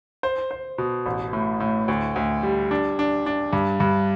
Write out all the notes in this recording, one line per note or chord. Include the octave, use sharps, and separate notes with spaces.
C5
C5
B2
A1
A2
A2
D2
D2
G3
D4
D4
D4
G2
G2